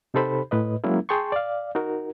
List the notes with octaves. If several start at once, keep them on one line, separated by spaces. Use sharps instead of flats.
C3 D#4 G4 A4 C5 B5
A2 B4 D#5
F#3 G#3 A#3 C#4 E4
G#4 G5 A5 C6 C#6
D5 F5
D#4 F#4 A#4